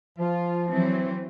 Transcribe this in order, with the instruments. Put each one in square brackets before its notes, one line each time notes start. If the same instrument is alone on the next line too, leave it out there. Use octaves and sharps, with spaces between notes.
[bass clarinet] F3 [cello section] F4
[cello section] E3 F#3 C4